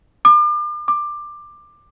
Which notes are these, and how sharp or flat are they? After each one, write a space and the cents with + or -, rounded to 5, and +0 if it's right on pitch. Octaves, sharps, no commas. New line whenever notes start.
D6 +40
D6 +15